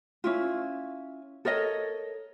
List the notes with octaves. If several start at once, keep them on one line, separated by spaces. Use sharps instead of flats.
C#4 E4 F4
A4 A#4 C#5 D#5